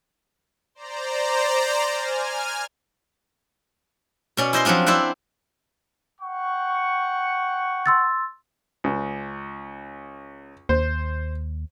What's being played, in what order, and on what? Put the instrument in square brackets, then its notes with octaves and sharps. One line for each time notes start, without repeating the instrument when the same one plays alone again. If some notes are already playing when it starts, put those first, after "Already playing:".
[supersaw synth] C5 D5 A#5
G#5 F6
[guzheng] B2 C#4 D5
E4 C5 D#5 C6
F3 F#3 C4 D4 F4
C4 E4 C5 D5 E5 F#5
[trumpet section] F#5 G5 C#6
[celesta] C6 E6 A6
[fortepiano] C#2
[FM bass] D#2 [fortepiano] C5